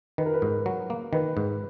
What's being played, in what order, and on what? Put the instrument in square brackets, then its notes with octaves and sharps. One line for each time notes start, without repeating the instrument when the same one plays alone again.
[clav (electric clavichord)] D#3 [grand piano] B4
[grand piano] A#4
B4
[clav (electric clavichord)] G#2
F#3
A#3
[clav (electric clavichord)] D#3 [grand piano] B4
[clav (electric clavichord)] G#2